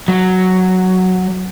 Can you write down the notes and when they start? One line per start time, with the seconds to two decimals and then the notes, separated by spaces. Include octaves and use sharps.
0.08 F#3